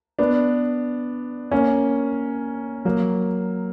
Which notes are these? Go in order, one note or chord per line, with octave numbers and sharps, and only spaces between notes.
B3 D4
A#3 C#4
F#3 A#3